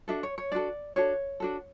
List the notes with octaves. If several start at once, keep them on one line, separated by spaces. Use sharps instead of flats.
D4 F#4 A4 E5
C#5
C#5
D4 F#4 A4 D5
D4 F#4 A4 C#5
D4 F#4 A4